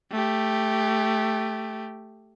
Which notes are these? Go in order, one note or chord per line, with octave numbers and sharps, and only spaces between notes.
A3 G4